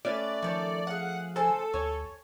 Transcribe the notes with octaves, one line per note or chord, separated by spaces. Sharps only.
A3 C#4 B4 D5
D#3 F3 A4 C#5
G#4 F5 F#5
C#3 A4 C5 G#5
D2 C#5 G#5